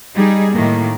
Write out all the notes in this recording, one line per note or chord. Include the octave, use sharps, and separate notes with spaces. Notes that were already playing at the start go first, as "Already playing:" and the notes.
G3 D#4 G#4
A2 D#3 A#3